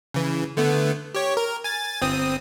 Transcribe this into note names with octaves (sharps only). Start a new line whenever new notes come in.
C#3 E3
D3 A3 B3
G4 C#5
A#4
G#5 A6
G1 C4 D#6